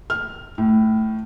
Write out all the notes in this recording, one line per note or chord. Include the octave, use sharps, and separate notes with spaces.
F6
A2